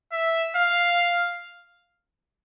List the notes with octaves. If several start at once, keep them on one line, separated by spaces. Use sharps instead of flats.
E5
F5